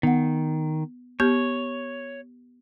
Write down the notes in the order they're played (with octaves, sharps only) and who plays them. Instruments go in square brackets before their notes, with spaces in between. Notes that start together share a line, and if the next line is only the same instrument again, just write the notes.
[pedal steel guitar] D#3 [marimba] B3 F#5
[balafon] B3 G4 [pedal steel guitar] C#5 [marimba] G6